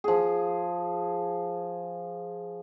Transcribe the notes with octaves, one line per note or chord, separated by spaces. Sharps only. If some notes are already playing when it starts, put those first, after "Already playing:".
F3 G#4